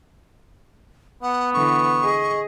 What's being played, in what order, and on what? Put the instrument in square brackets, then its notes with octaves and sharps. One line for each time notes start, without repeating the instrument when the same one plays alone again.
[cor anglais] B3 [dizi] F#5
[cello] D3 E3 [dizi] C#6
[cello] G#4 D#5